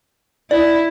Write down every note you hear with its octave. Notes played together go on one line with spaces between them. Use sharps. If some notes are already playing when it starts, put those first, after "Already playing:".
E4 D5